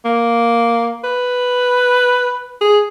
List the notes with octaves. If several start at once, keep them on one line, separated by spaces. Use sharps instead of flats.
A#3
B4
G#4